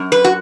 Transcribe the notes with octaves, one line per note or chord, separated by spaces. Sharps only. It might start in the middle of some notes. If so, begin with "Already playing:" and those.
Already playing: F#2
B4
F#4